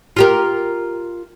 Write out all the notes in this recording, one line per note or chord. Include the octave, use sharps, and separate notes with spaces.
F4 G4 A#4